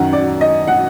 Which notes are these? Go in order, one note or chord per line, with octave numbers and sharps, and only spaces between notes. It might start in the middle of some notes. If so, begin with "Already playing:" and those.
Already playing: F#2 D#3 F#3 F#5
D5
D#5
F#5